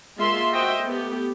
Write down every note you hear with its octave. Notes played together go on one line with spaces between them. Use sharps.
G#3 A#3 F4 E5 C6
F#4 C5 D#5 E5 G5
A3 B3 G4